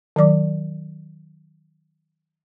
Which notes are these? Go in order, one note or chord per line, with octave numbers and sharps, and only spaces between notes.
D#3 F#3 D5 D6